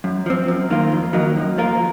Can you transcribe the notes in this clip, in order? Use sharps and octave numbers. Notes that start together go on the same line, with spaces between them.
F#2
F3 C4
F#2
D#3 A#3 F4
F2
D#3 F#3 A#3 D#4
F#2
F3 A#3 F4 A#4